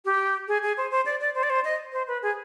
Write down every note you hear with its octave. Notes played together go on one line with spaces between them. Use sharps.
G4
G#4
G#4
C5
C5
D5
D5
C5
D5
C5
D#5
C5
B4
G#4